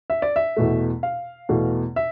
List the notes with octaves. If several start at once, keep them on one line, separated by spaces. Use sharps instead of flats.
E5
D5
E5
E2 B2 A3
F5
E2 B2 A3
E5